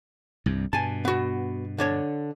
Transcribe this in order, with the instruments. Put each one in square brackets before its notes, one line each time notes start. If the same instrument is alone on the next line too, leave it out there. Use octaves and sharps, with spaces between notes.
[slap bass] C2 G2
[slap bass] G2 B2 [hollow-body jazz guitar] G#5 A5
[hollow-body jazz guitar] B3 F#4
D3 D4 C#5